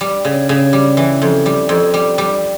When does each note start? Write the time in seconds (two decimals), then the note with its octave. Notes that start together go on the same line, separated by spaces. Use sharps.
0.01 G3
0.25 C#3
0.49 C#3
0.73 G3
0.97 E3
1.22 F2
1.46 G3
1.69 F2
1.94 G3
2.18 G3